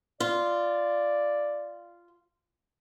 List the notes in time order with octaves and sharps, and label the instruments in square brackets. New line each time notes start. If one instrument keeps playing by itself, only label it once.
[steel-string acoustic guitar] F4 [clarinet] D5